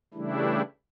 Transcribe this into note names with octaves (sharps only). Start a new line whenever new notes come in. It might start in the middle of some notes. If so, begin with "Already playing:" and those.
C#3 E3 G3 A3 D4 E4